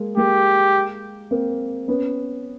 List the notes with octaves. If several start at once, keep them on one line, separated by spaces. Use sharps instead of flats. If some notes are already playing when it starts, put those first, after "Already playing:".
Already playing: G#3 A#3
G#3 A#3 G4
A#3 C4
B3 C#4